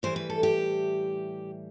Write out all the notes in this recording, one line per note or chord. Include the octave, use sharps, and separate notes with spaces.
A2 E3 G3 C5
B4
A4
G4